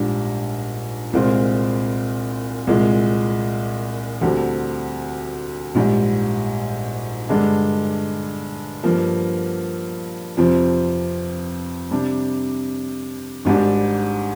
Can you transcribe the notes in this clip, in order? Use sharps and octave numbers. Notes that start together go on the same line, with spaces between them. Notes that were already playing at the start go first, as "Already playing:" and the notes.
Already playing: A#1 G#2 G3 D4
C2 A#2 G#3 C4 F4
C2 A#2 G#3
D2 D3 G3 C4 G4
A#1 G#2 G3
G2 D3 G#3 D4
G2 F3 A#3
F2 C3 F3 C4
C3 G3 D4
G#1 G#2 G3 D4